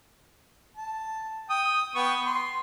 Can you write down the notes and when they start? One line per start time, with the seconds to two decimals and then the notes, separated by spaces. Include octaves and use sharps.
0.77 A5
1.50 G5 D#6
1.95 B3 G5 C#6
2.27 C6